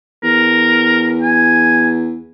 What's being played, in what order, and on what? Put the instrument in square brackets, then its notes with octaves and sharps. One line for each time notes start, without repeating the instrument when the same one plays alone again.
[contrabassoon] E2 [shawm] A#4
[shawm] G#5